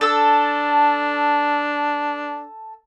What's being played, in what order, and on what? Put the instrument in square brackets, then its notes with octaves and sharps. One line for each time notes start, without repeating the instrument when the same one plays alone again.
[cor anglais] D4 [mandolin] A4 E6